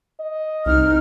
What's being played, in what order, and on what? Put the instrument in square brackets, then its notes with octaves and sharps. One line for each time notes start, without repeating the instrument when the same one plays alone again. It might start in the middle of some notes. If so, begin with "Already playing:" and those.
[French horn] D#5
[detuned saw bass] C2 [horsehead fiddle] D#4 [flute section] F6